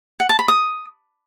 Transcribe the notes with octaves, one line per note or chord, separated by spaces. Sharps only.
F#5
A5
B5
D#6